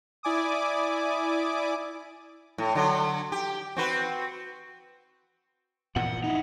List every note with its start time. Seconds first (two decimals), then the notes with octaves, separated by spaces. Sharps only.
0.23 E4 D5 G#5 D6 D#6
2.58 A2
2.75 D3 F#3
3.32 G4
3.76 C4 F#4 B4
5.96 A#2 E3 F3 F#5
6.24 D#4 E4